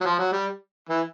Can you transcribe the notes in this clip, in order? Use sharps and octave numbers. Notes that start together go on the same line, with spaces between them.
F#3
F3
F#3
G3
E3